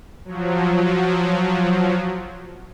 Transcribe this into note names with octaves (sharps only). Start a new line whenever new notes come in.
F3 F#3